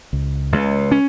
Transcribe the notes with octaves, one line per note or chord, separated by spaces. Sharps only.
C#2
C#2
C#4